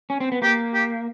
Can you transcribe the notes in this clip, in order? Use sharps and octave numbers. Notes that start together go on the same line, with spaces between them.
C#4
C4
B3
A#3 G4
G4